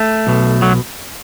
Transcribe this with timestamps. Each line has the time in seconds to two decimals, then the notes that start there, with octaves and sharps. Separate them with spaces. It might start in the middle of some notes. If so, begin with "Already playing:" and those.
Already playing: A3
0.27 B1 B2
0.62 F#3